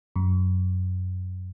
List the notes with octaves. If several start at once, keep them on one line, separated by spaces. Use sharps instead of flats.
F#2